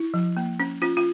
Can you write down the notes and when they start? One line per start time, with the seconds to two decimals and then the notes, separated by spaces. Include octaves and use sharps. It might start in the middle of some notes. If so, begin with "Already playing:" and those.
Already playing: E4
0.14 F3
0.37 A#3
0.60 C#4
0.82 C#4 F4
0.97 F4